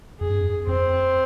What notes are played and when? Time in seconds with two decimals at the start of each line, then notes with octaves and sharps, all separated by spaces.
0.20 F2 G#4
0.30 G2
0.40 F2
0.67 F2 C4